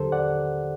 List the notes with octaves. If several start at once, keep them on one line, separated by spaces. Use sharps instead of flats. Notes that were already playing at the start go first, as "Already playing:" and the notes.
Already playing: D#2 D3 F#3 G4 A4 A#4 C5
D5 F#5